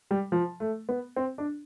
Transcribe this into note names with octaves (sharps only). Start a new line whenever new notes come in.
G3
F3
A3
B3
C4
D4